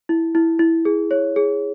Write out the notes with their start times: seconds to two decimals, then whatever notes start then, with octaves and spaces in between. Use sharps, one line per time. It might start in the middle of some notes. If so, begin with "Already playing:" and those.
0.09 E4
0.35 E4
0.59 E4
0.85 G#4
1.11 C#5
1.36 G#4